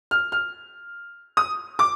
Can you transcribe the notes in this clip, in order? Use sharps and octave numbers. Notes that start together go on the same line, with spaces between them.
F6
F6
D#6
D6